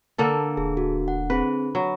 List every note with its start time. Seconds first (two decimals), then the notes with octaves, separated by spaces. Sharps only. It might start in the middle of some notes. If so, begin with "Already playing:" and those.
0.18 D3 A#3 A4
0.57 D#1 G#4
0.77 F#4
1.08 F#5
1.30 C4 G#4 B4
1.75 F#3 B5